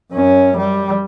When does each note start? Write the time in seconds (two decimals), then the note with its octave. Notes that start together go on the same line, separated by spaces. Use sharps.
0.12 F#2 C#4
0.57 G3